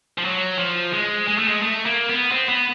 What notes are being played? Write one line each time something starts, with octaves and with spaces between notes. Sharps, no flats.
F3
F#3
F3
G#3
G#3
A3
G#3
A3
A#3
B3
C4
B3